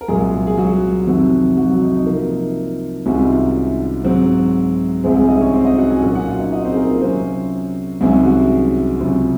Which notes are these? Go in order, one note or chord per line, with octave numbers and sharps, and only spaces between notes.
A#4
C2 A#2 F#3 G#3 G#4
G#4
F#3 F#4
F2 C3 D#3 F#3 F#4
F#3 F#4
F#3 F#4
D#4
D#4
C3 F3 A#3
C2 C3 D#3 G#3 C#4 F#4
F4
D#4
F4
G#2 F#3 C4 F#4
C2 C3 F3 G#3 C4 G#4
G#3 G#4
D#4 D#5
C#4 C#5
C4 C5
D#4 D#5
F#4 F#5
G#4 G#5
A#2 F#3 C#4 F#4 F#5
F#4 F#5
F4 F5
D#4 D#5
D#4 D#5
C4 C5
G#4
A#3 A#4
F4
C3 F#3 C4 C#4 C5
C2 C3 D#3 F#3 G#3 C#4 G#4
F#3 F#4
C#2 C3 F#3 C#4 F4